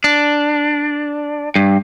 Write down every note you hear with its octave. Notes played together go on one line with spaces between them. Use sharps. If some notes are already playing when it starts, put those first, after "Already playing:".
D4
G2